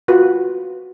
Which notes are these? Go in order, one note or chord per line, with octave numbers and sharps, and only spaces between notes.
F4 F#4 B4